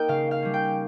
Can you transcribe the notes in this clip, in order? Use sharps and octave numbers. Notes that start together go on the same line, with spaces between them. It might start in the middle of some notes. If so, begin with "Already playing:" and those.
Already playing: A#3 D#4 A#4 G5
C#3 F5
F5
G3 C#4
G5